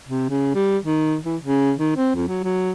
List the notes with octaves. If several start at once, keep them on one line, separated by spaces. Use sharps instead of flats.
C3
C#3
G3
D#3
E3
C#3
D#3
C4
F2
F#3
F#3